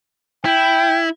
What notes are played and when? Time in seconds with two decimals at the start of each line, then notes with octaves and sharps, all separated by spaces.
0.45 E4 G5